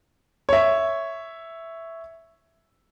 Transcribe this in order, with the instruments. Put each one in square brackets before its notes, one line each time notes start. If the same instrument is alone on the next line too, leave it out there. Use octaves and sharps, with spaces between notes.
[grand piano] C#5 E5